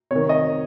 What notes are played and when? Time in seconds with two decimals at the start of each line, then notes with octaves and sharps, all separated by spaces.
0.11 C3 D#3 C#5
0.29 D#5